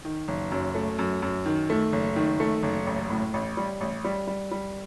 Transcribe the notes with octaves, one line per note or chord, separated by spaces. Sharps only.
D#3
F#1
F#2
A3
F#2
F#2
D#3
A3
F#1
D#3
A3
F#1
A1
A2
A1
G3
A1
G3
G3
G3